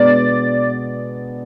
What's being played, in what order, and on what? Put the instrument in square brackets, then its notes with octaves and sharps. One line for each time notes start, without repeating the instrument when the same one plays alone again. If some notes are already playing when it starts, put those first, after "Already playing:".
Already playing: [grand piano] B2 G#3 B3 D4 [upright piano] D5